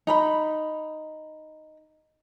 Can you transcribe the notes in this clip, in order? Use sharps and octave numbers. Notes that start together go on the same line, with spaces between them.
D#4 A#5 B5